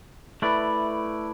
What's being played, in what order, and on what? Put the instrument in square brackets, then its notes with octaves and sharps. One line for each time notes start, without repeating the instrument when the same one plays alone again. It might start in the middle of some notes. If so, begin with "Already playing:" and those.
[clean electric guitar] A3 E4 B4 D5